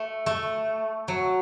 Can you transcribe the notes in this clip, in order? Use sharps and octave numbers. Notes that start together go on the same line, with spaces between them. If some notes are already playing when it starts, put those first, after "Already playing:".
Already playing: A3
A3
F#3